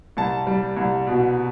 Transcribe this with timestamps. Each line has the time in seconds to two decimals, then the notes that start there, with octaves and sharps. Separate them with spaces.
0.17 C2 A5
0.47 G3
0.77 C2
1.07 B2